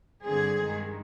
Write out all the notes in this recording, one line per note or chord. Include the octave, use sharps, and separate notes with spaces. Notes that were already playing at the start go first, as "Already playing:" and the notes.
G2 D3 G3 C4 G#4
G2 D#3 G#3